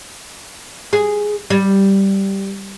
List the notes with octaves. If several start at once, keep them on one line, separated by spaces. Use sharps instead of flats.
G#4
G3